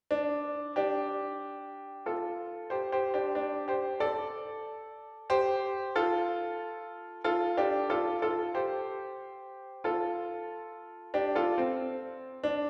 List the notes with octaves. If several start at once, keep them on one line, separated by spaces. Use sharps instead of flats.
D4
D4 G4
F4 A4
G4 C5
G4 C5
D4 G4
D4 G4
G4 C5
A4 D5
G4 C5
F4 A4
F4 A4
D4 G4
F4 A4
F4 A4
G4 C5
F4 A4
D4 G4
F4 A4
C4
D4